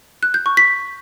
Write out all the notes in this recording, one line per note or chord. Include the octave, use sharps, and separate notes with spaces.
F#6
G6
C#6
B6